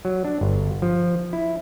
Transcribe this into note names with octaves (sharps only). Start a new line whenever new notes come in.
F#3
D4
G1
F3
E4